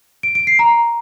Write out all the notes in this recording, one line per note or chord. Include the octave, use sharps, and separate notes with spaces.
D7
D7
C7
A#5